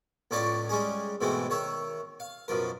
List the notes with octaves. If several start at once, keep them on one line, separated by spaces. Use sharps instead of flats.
C#2 A2 C#4 F4 C#5 D5
G3 G#3 C#4 G#4
G#2 B2 E3 G#3 A3 C4
D#3 C#5 E5
F5
F#2 B2 F3 A#4